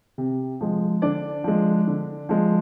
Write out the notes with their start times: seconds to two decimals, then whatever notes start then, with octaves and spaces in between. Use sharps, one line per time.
0.18 C3
0.61 F3 G#3
1.02 D3 D4 D5
1.44 F3 G#3
1.88 D3
2.29 F3 G#3